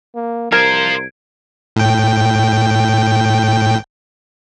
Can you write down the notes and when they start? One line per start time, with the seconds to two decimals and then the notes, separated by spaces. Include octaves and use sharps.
0.15 A#3
0.52 C2 F4 A#4 C5 G#6 D7
1.76 A2 G5